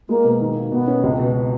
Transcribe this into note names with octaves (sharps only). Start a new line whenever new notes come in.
G#3 A#3
B2
D#3
A#3
B2 B3
C#4
C#2
B2